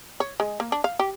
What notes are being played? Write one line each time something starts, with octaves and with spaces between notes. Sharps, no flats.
C#5
G#3
A#3
D4
F5
G4